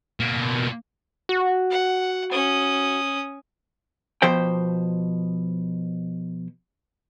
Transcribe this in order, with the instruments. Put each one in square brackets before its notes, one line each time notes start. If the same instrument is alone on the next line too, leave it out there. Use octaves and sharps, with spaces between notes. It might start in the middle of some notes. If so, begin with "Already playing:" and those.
[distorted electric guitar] B2 A#3
[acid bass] F#4
[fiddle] F#5
C#4 D#6
[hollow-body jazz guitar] B2 F3 C5 G5